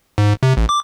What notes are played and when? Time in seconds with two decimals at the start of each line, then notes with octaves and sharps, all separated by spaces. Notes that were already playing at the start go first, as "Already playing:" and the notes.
0.18 G#2
0.43 C3
0.57 A1
0.69 D6